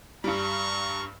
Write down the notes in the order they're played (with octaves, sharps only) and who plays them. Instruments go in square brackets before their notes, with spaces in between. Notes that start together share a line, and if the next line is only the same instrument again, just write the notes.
[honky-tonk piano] G2 G3 [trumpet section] A#5 C#6